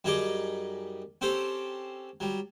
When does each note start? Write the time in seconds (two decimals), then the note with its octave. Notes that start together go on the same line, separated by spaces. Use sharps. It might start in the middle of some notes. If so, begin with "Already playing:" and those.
0.04 F#2 G3 D#4 G#4 D#5 D6
1.21 C4 C#4 G4 A4 C5
2.20 F#3 G3